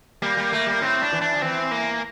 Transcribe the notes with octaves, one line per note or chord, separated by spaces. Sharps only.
G3 A#3
G3
A3
G3
A2 C4
D4
E3
D4
F3
E3 C4
A#3